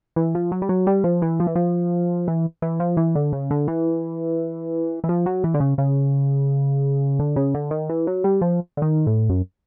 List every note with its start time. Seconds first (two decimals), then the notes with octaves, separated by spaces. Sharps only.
0.16 E3
0.35 F3
0.52 F#3
0.62 G3
0.69 F#3
0.87 G3
1.04 F3
1.22 E3
1.40 F3
1.47 E3
1.55 F3
2.28 E3
2.62 E3
2.80 F3
2.97 E3
3.15 D3
3.33 C#3
3.51 D3
3.68 E3
5.04 E3
5.09 F3
5.26 F#3
5.44 E3
5.54 D3
5.60 C#3
5.78 C#3
7.19 D3
7.36 C#3
7.55 D3
7.71 D#3
7.89 E3
8.07 F#3
8.24 G3
8.41 F3
8.77 D3
8.82 D#3
9.07 A2
9.30 F#2